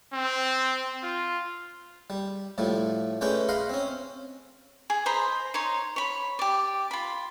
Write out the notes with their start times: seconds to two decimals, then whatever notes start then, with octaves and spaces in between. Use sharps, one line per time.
0.13 C4
1.03 F4
2.10 G3
2.58 A2 F3 G3 A3
3.21 G#3 A3 C#4 B4 D5 G5
3.49 D#5 F5 F#5 B5 C6
3.69 C4 C#4
4.90 G#4
5.06 C5 D#5 A#5 B5
5.54 D#4 C#5 C6
5.96 C#5 B5
6.39 G4 D5
6.91 F4 B5